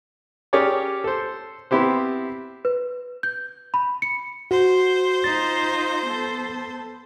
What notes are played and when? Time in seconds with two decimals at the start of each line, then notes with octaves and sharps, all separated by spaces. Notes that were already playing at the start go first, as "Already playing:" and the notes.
0.53 C#4 G4 G#4 A#4 C#5 D5
1.04 A4 C5
1.71 B3 C4 E4 G4 C5
2.65 B4
3.23 G6
3.74 B5
4.02 C#7
4.51 F#4 C5
5.24 D#4 F4 A6
6.06 B3 A4